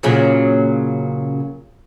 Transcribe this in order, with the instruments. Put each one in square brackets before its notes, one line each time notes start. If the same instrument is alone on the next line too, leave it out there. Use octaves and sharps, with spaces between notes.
[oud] A#2 C#3 F#3